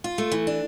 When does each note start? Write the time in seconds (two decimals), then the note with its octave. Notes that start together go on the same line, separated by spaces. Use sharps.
0.04 F4
0.18 A3
0.32 E3
0.47 D4